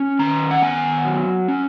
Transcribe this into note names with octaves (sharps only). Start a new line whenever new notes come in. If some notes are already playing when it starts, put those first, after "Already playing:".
Already playing: C#4
D#3 A#5
F#5
B3 G#5
F#3
C#4